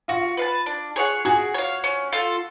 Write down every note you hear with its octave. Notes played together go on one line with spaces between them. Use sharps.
F4 F#4
B4 F5 A5
D4
G#4 C#5 F#5
F#4 G#4
C#5 F5
C#4
F4 A4